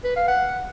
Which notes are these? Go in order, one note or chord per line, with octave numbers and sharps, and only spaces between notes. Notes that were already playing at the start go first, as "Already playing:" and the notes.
B4
F5
F#5